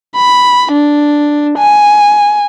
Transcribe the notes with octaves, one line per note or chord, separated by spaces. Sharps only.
B5
D4
G#5